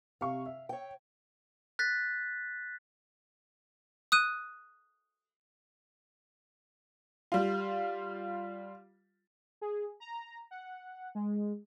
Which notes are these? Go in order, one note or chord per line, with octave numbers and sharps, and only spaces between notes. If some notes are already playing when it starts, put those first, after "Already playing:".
C3 F5 C#6
E5
C#5 G5
F#6 A6 B6
D#6 F#6 D#7
G3 F4
G#4
A#5
F#5
G#3